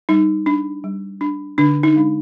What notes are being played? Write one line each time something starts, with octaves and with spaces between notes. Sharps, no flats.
G3 D#4
D4
G3
D4
D3 D4
D#4
G#3 D4